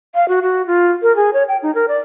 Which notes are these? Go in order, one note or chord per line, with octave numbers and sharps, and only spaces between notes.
F5
F#4
F#4
F4
A#4
G#4
C#5
G5
D#4
A#4
D5